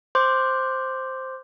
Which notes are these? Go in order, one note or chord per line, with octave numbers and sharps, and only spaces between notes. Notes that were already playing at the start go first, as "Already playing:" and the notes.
C5 C6 D6 G6